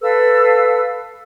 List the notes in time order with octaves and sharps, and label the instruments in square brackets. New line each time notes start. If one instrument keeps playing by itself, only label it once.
[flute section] A4 B4 F5 E6